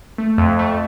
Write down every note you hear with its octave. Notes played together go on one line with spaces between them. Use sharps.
A3
F2
A3